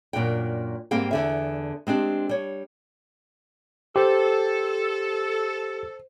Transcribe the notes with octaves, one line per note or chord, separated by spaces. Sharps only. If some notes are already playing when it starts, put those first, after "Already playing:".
F#2 A#2 D4 G5
G#2 G3 A#3 C4 F5 G5
E2 D3 E5
G#3 C4 D4 G4
G3 C#5
G4 A4 C5